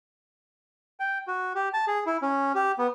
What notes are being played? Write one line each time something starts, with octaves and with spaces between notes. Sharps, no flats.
G5
F#4
G4
A5
G#4
E4
C#4
G4
B3